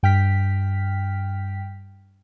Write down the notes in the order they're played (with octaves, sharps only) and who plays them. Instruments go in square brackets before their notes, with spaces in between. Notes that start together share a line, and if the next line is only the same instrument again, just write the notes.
[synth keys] G2 G5 F6 B6